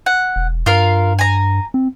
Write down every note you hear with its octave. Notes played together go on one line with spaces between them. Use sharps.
F#5
E1
G2 F4 A#4 F5
G#5 A#5
C4